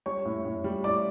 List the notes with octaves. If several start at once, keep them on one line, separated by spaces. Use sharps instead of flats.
G3 C#5 C#6
A2
A2
G3
A2 D5 D6